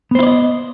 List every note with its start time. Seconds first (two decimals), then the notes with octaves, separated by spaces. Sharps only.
0.11 B3
0.15 C5
0.19 E4
0.23 D5
0.27 D#5